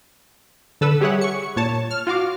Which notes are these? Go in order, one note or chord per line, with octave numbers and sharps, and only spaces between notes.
D3 A4 B4 E6
G3 G4 G#4 C#5 E5 F#5
C#6 C#7
A#2 C#5 A5
F6
F4 F#4 F5 D6